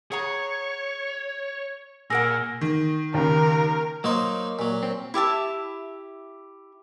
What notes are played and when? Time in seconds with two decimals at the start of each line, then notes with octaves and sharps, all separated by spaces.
0.12 G#4 C#5 F#5 A#5
2.10 A#2 G#4 A#4 F#5 G#5 E6 A#6
2.61 D#3
3.14 D#2 C#3 A#4
4.04 F#3 A#3 D#4 C5
4.59 A#2 F#3
4.83 C4
5.14 E4 G4 E5 A5